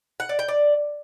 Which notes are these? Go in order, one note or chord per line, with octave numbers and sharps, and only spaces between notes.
F#5
D5
G5
D5